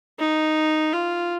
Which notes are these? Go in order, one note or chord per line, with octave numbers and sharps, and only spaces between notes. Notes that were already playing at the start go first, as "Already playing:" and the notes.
D#4
F4